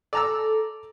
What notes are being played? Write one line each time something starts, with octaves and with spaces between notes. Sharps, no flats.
A4 D5 A#5 E6